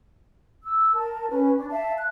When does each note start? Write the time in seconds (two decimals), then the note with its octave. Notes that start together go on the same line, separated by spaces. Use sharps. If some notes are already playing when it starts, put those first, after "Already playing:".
0.63 E6
0.93 A#4 A5
1.29 C#4 B4
1.56 D4
1.70 E5 F5 A5
1.97 F#6